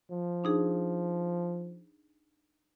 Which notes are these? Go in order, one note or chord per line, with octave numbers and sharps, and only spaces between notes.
F3
D4 D#4 G#4